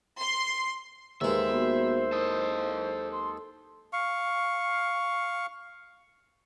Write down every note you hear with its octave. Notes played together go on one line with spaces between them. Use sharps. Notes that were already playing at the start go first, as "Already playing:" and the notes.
C6
D#2 G#3 B4 C5 E5 F5 A#5
A#3 B3 F#4
E4 A4 A#4 D#5
C6
F5 C#6